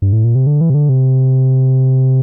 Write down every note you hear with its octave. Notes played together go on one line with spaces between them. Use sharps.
G2
A2
A#2
C3
D3
E3
C3
D3
C3